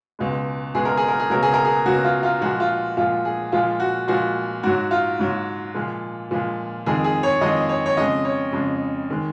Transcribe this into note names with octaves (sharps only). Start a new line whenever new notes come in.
C#2 B2 G#3
C#2 B2 G#3 G#4
A#4
G#4
A#4
G#4
C#2 B2 F#3 A#4
G#4
A#4
G#4
C#2 B2 F#3 F#4
F4
F4
A#2 F3 G#3 F#4
F4
A#2 F3 G#3 F4
G#4
A#2 F3 G#3 F4
F#4
A#2 F3 G#3 F#4
G#2 F#3 F#4
F4
G#2 F#3
A#2 F3 G#3
A#2 F3 G#3
F2 D#3 G#3 G#4
G#4
C#5
F2 D#3 G#3 D#5
C#5
C#5
F2 C#3 G#3 D#5
C#5
F2 C#3 G#3
D#3 G#3